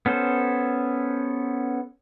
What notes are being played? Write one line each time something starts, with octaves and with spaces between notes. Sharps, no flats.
B3 C#4 A4 C5